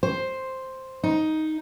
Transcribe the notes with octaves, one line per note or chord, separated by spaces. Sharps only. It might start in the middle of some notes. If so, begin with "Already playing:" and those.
C5
D#4